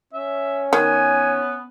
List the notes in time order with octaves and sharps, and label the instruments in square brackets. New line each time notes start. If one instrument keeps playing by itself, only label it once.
[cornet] C#4 [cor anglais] E5
[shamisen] D#3 [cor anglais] B3 [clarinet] G#5